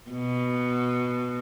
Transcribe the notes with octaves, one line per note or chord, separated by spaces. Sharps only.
B2